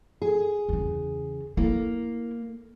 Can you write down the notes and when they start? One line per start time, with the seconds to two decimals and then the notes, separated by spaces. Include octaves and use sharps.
0.22 G#4
0.69 E2 C#3
1.57 A#3 E4